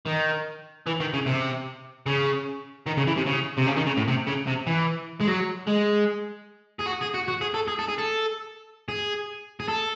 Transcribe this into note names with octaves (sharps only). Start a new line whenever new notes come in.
D#3
E3
D#3
C#3
C3
C#3
D#3
C#3
E3
C3
C#3
C3
C#3
D#3
C#3
A2
C3
C#3
C3
E3
G#3
F#3
G#3
G#4
F#4
G#4
F#4
F#4
G#4
A4
G#4
A4
G#4
A4
G#4
G#4
A4